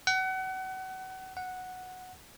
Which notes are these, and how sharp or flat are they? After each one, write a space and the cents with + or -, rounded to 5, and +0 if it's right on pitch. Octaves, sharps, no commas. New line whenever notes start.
F#5 +30
F#5 -5